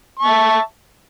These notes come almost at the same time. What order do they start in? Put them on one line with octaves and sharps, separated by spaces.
C#6 A5 E5